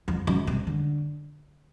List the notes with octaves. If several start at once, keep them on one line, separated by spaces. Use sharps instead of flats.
F2
F#2
C3
D3